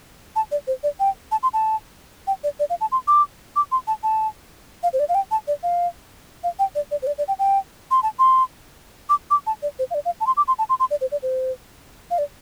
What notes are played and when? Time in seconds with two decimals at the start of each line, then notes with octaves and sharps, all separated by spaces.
0.36 A5
0.51 D5
0.67 C5
0.83 D5
1.00 G5
1.32 A5
1.43 C6
1.53 A5
2.27 G5
2.44 D5
2.60 D5
2.70 F5
2.81 A5
2.92 C6
3.08 D6
3.56 D6
3.72 C6
3.87 A5
4.03 A5
4.83 F5
4.93 C5
5.00 D5
5.09 F5
5.15 G5
5.31 A5
5.48 D5
5.63 F5
6.44 F5
6.59 G5
6.75 D5
6.91 D5
7.02 C5
7.07 D5
7.18 D5
7.28 G5
7.39 G5
7.91 C6
8.03 A5
8.19 C6
9.09 D6
9.31 D6
9.47 A5
9.62 D5
9.79 C5
9.91 F5
9.94 D5
10.05 F5
10.20 A5
10.27 C6
10.37 D6
10.48 C6
10.58 A5
10.69 C6
10.80 C6
10.91 D5
11.01 C5
11.12 D5
11.23 C5
12.11 F5
12.18 D5